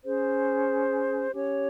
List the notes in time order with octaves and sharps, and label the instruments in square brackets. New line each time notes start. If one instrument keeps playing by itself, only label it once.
[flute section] C#4 G#4 C5
C#4 G4 C#5